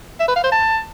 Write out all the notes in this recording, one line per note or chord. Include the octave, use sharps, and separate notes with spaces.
E5
B4
F5
C5
A5